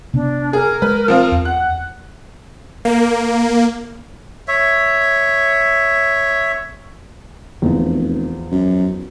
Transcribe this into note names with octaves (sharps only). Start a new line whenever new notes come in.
C3 B3 D4
G#4 A#4
G#3 B4
F3 C4 F4
E2
F#5 F#6
A#3
C#5 E5
F1 E2 F3
F#2